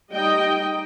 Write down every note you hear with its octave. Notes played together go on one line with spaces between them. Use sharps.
G3 D#4 D#5 G5